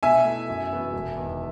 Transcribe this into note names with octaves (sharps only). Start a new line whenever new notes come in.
B2 E5 G#5
A3 E4
F#2
E3 B3 F#4
E1
E2 D#3